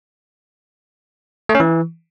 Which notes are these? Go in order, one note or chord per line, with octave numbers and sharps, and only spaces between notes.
A3
C#4
E3